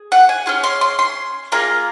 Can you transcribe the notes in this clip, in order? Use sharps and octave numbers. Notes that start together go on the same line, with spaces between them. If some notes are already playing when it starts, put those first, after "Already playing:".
Already playing: G#4
F#5
G#5
C#4 F4 G#4
C6
C6
C6
A#3 F4 G#4 A#5